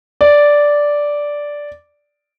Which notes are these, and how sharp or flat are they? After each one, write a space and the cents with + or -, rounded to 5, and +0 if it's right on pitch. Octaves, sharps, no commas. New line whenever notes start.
D5 -5